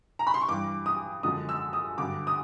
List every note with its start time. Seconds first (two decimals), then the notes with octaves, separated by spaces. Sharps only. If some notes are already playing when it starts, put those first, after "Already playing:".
0.19 A#5
0.27 B5
0.34 C6
0.41 C#6
0.49 G2 E3 G3 D6
0.86 D#6
1.23 F#2 D3 F3 G#3 D#6
1.49 E6
1.73 D#6
1.98 G2 D3 F#3 D6
2.27 D#6